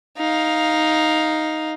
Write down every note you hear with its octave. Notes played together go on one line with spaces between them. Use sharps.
D#4 F5